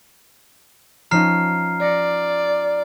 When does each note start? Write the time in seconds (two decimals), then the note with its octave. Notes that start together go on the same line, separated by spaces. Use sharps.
1.11 F3 C#4 D#4 A#5 F6 C7
1.81 D5 A#6 C#7